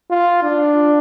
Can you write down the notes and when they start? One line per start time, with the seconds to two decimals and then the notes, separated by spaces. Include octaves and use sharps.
0.10 F4
0.43 D4